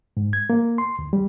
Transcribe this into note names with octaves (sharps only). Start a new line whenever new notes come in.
G#2
G#6
A#3
C6
D2
G3